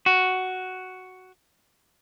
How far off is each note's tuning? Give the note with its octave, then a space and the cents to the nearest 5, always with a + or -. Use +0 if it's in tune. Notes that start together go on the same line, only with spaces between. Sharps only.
F#4 +5